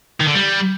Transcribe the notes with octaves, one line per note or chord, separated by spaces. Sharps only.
D#3
D3
G3